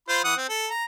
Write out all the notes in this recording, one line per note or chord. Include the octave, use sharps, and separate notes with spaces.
F4 C5 B5
E3 F#5 D#6
C4
A4
A#5